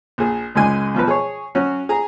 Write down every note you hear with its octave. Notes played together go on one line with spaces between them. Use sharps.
A#1 G#4
C#2 F#2 G#3 G#5
B2 F3 F#3 B4
G#4 C#5
F#3 C#4 F#4
G#4 A#5